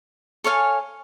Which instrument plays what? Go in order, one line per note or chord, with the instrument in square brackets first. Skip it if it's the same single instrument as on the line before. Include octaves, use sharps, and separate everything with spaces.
[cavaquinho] A4 C#5 F5 G#5